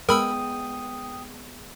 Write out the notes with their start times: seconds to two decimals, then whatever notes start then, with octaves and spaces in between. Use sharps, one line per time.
0.09 G#3 B3 A#4 G5 B5 D#6 E6